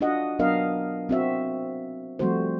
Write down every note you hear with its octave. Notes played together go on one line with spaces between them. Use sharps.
D4 F4 F#4 D#5 F#5
F#3 B3 D4 A#4 D#5 F5
C4 F#4 E5
F3 G3 A3 C4 F#4 C5